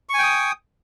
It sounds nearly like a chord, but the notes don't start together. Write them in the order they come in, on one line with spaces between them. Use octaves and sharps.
C#6 G#5 G5 D#6